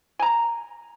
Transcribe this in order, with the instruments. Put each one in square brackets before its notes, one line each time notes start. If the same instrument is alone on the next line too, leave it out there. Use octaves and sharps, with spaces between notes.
[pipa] G#5 A#5